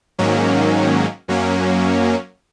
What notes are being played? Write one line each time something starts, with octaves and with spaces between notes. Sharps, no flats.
G#2 D#3 F#3 A#3 C#4
F#2 F#3 A#3 C#4